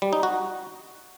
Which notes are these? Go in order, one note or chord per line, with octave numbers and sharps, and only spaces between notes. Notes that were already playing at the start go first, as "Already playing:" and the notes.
G3
D#4
F#4